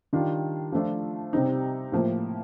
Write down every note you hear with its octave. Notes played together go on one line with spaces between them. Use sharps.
D#3 G3 D4 F4
F3 A3 D4 F4
C3 G3 C4 D#4
A2 F3 A#3